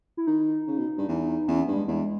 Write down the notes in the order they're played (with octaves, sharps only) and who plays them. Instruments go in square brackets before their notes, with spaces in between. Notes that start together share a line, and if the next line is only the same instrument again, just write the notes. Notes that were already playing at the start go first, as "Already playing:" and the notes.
[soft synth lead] E4
[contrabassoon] D#3 [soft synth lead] D#4
[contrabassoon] C#3
B2
G2
E2
[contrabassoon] E2 [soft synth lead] C#4
[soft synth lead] B3
[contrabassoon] G2
[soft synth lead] G#3
[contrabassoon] E2 [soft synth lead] G#3